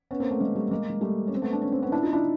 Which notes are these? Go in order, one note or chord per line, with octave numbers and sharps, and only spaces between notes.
B3 C#4
A#3 C4
A3 B3
G#3 A#3
G3 A3
A3
G#3 A#3
G#3
G3 A3
C#4
C4
A3 B3
D4
C#4
C4
B3 C#4
D4 E4
D#4 F4
D4 E4